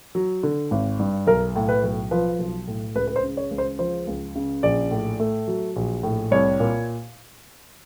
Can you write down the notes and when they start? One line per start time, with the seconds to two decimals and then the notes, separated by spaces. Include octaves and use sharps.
0.15 F#3
0.43 D3
0.71 G#1
0.99 G2
1.27 B1 A#4
1.56 A2
1.69 B4
1.83 B1
2.11 F3 B4
2.39 B1
2.67 A2
2.95 C#2 B4
3.07 B4
3.16 C5
3.23 C#3
3.37 C#5
3.51 C#2
3.58 C5
3.79 F3 C5
4.07 C#2
4.36 C#3
4.63 A#1 D5
4.91 A2
5.20 A3
5.48 F#3
5.76 A#1
6.03 A2
6.31 C2 C#5
6.60 A#2